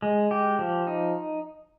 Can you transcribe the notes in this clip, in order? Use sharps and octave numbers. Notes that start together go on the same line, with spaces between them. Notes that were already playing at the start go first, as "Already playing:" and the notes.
G#3
G4
F3
D#4